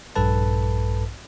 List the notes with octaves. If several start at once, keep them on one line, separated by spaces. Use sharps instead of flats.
A#1 G2 A4 B4 A5